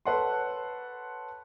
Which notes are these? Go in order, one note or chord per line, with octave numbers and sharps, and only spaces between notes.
A4 B4 C#5 F#5 A5 C6